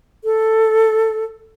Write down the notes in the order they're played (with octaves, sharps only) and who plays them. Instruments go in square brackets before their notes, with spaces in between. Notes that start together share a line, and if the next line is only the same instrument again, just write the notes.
[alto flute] A4